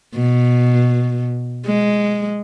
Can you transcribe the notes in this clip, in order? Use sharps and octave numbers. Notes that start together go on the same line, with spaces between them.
B2
G#3